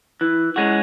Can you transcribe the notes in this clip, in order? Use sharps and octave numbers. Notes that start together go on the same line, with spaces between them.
E3
G#3 C#4 F#4